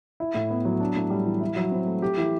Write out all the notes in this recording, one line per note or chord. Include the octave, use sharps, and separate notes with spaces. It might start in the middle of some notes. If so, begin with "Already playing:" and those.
E4
A2
B3
F#3
D4
A2
G3
E3
E4
F#3
C4
A3
G4
E3